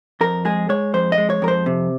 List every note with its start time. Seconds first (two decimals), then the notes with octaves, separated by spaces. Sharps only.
0.21 F2 A#4
0.45 G#3 G#4
0.69 G#3 C#5
0.94 F2 C5
1.12 D#5
1.18 G#3
1.30 C#5
1.42 F2 A#4
1.48 C5
1.66 C3